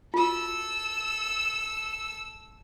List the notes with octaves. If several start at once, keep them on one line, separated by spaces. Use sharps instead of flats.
F4 F#4 A4 E6